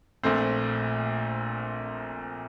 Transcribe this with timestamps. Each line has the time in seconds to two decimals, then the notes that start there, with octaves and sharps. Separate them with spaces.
0.23 A#1 A#2 A3 C4